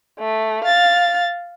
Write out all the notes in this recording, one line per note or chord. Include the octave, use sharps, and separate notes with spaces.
A3
F5 A6